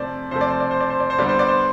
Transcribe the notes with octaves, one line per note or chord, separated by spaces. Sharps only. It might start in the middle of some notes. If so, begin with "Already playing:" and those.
Already playing: C3 F3 A3 C5 D5
C3 F3 A3 C5
D5
C5
D5
C5
D5
C5
D5
C5
D3 G3 B3 D5
C5
D5
C5